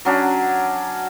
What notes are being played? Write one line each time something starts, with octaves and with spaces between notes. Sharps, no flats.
F#3 C#4 D4